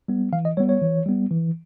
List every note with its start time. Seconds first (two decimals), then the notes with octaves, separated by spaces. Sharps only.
0.08 G3 B3
0.33 E3 F5
0.45 D#5
0.57 G3 B3 C#5
0.69 C#5
0.81 E3
1.06 G3 B3
1.31 E3